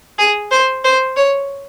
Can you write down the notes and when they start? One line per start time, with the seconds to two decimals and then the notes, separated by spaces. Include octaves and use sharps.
0.19 G#4
0.51 C5
0.84 C5
1.17 C#5